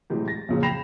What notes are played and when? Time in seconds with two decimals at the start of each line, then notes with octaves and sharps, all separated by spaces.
0.10 A2 C3 E3 F#3 G#3
0.28 A6 A#6
0.49 F2 A#2 C#3 F3 F#3
0.63 G5 B5 A#6 C7 E7 F7